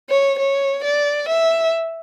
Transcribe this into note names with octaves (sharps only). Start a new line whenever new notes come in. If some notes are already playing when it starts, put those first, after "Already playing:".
C#5
C#5
D5
E5